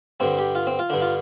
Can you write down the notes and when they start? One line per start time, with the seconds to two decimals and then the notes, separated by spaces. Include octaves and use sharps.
0.20 G2 D3 C4
0.39 G4
0.55 F4
0.67 C4
0.79 F4
0.90 G2 D3 D4
1.02 F4